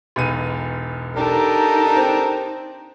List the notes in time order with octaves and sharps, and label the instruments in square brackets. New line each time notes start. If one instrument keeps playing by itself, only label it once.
[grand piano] E1 B1 D#7
[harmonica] D4 G4 A#4 [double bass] D#4 [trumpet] A4
[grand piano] C4